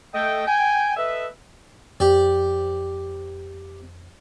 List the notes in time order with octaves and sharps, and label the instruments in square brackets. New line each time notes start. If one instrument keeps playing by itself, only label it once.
[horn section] A3 D#5 G5
G5 G#5
A4 B4 D#5 E5
[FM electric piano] F2 [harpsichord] G4 D5